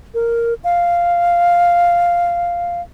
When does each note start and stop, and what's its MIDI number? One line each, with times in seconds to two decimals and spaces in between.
0.14 0.54 70
0.64 2.81 77